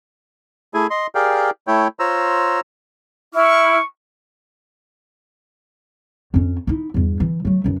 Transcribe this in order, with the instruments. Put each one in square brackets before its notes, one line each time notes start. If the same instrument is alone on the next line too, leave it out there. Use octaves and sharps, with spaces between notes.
[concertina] A3 E4 G#4 G#5
D#5 C6
G4 G#4 A#4 D5 F5 G5
A3 E4 C#5 G5
F4 C5 C#5 A#5 E6
[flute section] E4 F6 [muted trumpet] C#6
[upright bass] F2 C#4
D#4 E4
E2 G2
E3
F#3 A3
F#2 E3